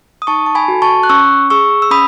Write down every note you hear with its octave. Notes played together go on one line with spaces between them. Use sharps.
D#6
D#4 A5 C#6
A5
G#5 B5
F#4 A4
A5 C#6
F#6
C#4 C#6 E6
G#4 C#6 E6
E6
C#4 B5 D#6